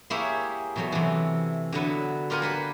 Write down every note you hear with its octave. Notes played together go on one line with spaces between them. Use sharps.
A#3 E4 G4 G#4 C#5 E5
B2 F#3 A3
C3 E3
D3 F#3 B3 B4
F4 G4 A#4 F#5 G#5
A#3 B4 F#5